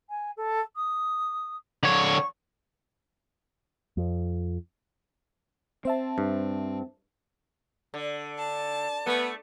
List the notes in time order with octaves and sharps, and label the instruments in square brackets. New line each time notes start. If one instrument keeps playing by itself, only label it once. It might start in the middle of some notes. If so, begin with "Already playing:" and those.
[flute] G#5
A4
D#6
[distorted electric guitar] D3 C#5
[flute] C#6
[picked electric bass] F2
[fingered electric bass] C4 [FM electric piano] C5 E5 A5
[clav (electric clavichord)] G2
[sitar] D3
[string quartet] A5
[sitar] A3 [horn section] B3